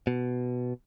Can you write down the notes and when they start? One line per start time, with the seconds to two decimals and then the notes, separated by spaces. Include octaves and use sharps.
0.07 B2